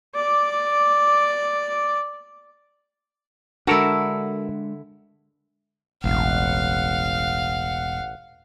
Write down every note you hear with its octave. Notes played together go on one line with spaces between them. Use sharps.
D5 D6
D3 G#3 D4 E4 F#4 A4 A#4
E1 A1 F5 F#5